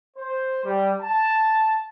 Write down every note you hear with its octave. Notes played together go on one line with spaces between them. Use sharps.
C5
G3
A5